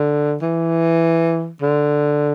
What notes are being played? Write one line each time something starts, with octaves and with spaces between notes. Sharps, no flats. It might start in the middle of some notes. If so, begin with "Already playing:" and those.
Already playing: D3
E3
D3